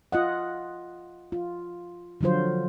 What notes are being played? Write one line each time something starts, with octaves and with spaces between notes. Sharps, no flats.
F4 D#5 F#5
F4
D3 F3 F#3 F4 C5